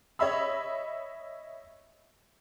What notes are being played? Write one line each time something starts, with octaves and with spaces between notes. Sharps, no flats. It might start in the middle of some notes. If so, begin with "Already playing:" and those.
C#5 D#5 E5 B5 E6